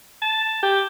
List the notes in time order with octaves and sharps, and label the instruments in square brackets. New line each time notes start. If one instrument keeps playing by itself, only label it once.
[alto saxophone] A5
G4